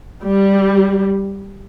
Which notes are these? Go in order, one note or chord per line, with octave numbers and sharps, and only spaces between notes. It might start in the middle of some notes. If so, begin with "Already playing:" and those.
G3